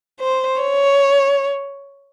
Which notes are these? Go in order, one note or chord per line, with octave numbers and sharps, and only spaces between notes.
C5
C#5